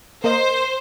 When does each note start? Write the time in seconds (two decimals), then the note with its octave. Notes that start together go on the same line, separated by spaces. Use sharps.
0.24 A#3 A#4 C5 D#5